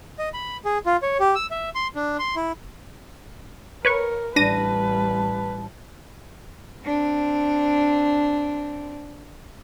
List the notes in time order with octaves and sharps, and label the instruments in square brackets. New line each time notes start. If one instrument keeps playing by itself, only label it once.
[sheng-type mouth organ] D#5
B5
G#4
F4
C#5
G4
E6
E5
C6
D4
C6
E4
[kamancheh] A#4 [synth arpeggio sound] B4 C#5 C#6
[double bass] A1 G3 [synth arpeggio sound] D4 A#6 D#7 [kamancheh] B4 [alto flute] A5
[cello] C4 D4